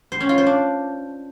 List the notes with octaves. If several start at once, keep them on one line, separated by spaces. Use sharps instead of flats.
C5
C#4
F4
C5
D4